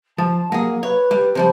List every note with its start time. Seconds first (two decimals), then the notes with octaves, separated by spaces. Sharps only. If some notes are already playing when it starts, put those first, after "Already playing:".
0.18 F3 A5
0.52 F#3 A#3 G#4
0.83 B4 C#5
1.11 G3
1.35 C3 F3 G3 C5